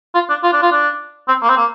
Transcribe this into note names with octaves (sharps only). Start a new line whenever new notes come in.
F4
D4
F4
D4
F4
D4
C4
A#3
C4
A#3